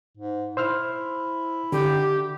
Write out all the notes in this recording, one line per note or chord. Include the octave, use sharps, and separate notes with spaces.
G#2
E4 C5 E6 F6
D3 G4